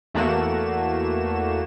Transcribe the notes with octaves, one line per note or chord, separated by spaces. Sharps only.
E2 A3 A#3 F#4 E7